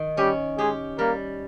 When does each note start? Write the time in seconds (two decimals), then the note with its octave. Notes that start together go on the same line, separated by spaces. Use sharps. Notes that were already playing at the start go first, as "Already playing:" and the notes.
Already playing: D#3
0.17 G3 C#4 G4
0.58 G#3 G4 G#4
0.98 G3 A#3 A#4